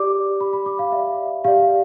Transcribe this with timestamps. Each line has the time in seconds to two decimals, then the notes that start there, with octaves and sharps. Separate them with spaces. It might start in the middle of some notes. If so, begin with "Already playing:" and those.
Already playing: G4 D5 D6
0.40 G4 D5 B5
0.53 B5
0.66 D6
0.79 F5
0.92 G4 D5 E5
1.44 G4 D5 F5